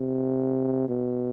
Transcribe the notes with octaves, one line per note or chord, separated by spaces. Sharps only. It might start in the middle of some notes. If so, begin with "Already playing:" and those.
Already playing: C3
B2